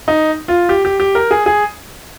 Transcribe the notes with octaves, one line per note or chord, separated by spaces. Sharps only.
D#4
F4
G4
G4
G4
A#4
G#4
G#4